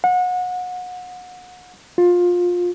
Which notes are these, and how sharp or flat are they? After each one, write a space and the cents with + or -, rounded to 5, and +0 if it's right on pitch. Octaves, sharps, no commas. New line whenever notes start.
F#5 -30
F4 +20